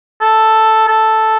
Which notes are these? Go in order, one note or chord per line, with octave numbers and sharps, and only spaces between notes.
A4
A4